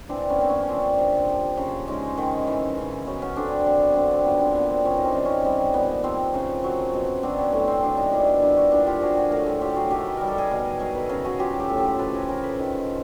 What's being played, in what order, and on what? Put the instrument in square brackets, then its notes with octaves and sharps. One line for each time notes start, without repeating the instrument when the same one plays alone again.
[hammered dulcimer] E3 C4 D4
B3 C#4
A#3 C4
B3 C#4
C#4
F3 C4 D4
C3
F3
C#3
G#3 C#4 D#4
D#3
E3
C#3
F#3 B3 C#4
B3 C#4
D3 C4 D4
F#3 C4
B3
D3 C4
C4
F3 B3 C#4
C4 D4
A#2 B3
C4
F3 B3 C#4
D#4
C4 D4
C#3
C#4 D#4
G3 C4
A#2 B3
F3 C4
C#3
F#3
B2
F#3 C4 D4
B3 C#4
A2 C4
C4
F#3 C4 D4
C#4 D#4
A#2 D4 E4
B3
G3 D4 E4
E4 F#4
A#2 D4 E4
F4 G4
F3 F#4 G#4
F#4 G#4
A2 G#4 A#4
G4 A4
F#3 F4 G4
F#4 G#4
D#3 G4 A4
B4
G3 A#4
A4
G#4 A#4
B2
F#3 G#4 A#4
A4 B4
C#3 G#4 A#4
F#4 G#4
F#3 F4 G4
G4 A4
A2
G4 A4
F3 A4 B4
G#4 A#4
C#3 G#4 A#4
A4 B4
D#3